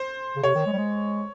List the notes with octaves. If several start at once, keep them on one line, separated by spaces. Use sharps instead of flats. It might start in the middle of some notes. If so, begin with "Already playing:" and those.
Already playing: C5
C#3
C3 C#5
D#3
G#3
G3
G#3